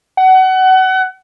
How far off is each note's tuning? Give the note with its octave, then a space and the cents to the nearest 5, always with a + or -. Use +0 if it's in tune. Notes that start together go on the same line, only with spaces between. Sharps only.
F#5 +25